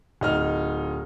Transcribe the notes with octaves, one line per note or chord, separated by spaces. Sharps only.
D1 D#4 F6 F7